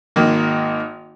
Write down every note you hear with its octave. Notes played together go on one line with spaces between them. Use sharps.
G#1 D#3 A#3